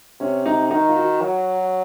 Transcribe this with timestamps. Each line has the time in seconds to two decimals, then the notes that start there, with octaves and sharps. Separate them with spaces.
0.20 C3 C#4
0.46 D#4
0.71 D#3 D#4
0.89 F4
0.97 F#4
1.22 F#3